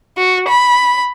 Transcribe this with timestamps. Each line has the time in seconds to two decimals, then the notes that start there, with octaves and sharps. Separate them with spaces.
0.17 F#4
0.48 B5